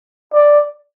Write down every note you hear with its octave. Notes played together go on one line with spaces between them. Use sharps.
D5